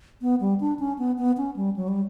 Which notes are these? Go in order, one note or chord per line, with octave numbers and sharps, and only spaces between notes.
B3
G3
D4
C#4
B3
B3
C#4
G3
F#3
G3